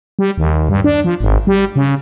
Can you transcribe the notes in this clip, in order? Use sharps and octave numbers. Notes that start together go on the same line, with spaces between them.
G3
D#2
G2
D4
F3
G#1
G3
C#3